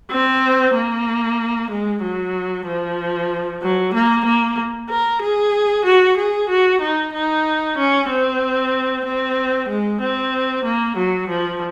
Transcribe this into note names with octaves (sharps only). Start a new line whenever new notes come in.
C4
A#3
G#3
F#3
F3
F#3
A#3
A#3
A#4
G#4
F#4
G#4
F#4
D#4
D#4
C#4
C4
C4
G#3
C4
A#3
F#3
F3